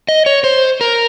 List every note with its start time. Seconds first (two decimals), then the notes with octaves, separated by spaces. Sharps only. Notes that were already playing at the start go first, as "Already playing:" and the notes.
0.09 D#5
0.26 C#5
0.44 C5
0.81 A#4